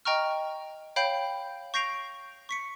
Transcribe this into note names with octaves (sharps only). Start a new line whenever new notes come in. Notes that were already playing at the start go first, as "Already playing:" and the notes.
D#5 G5 A#5 C#6 F6
C#5 F5 G5 B5 G6 C7
C#6 G6 A#6 C7 D7 F7
C#6 B6 C#7